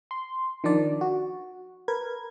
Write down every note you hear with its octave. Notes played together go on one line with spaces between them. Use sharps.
C6
D#3 F3 D4 D5
F#4
A#4 B4 G#6